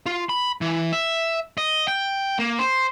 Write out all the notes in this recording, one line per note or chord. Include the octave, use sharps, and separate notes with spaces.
F4
B5
E3
E5
D#5
G5
A#3
C5